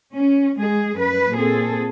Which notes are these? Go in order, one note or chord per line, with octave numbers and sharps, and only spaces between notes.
C#4
G#3 G#4
F#2 B4
A#2 C4 G#4 A4